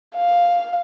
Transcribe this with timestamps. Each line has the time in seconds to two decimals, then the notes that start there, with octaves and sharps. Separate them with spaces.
0.16 F5